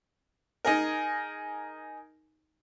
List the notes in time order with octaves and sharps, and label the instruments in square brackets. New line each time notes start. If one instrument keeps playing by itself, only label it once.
[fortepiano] D#4 G#4 A#4